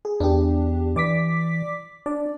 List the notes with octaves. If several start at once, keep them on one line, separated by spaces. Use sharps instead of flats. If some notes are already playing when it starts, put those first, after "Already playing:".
G#4
E2 D4 G4
E3 D5 D6 B6
D4 D5